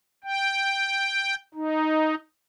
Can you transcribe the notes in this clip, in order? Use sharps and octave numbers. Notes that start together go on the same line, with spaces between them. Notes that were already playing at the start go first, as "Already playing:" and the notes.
G5
D#4